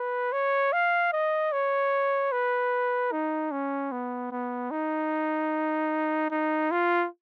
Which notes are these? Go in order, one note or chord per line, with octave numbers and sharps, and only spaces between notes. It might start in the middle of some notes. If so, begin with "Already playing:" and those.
Already playing: B4
C#5
F5
D#5
C#5
B4
D#4
C#4
B3
B3
D#4
D#4
F4